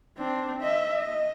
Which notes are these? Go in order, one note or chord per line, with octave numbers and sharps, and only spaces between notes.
C4 D4
D#5 E5
D#5